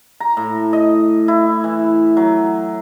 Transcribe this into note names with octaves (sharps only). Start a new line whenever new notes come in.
A#5
A2
D#5
E4
E3
F#3